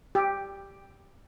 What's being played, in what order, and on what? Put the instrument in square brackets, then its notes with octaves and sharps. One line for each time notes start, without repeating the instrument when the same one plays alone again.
[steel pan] G4